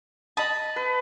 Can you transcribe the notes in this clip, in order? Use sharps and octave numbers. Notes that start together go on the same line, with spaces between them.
D#5 A5 B5 D#6
B4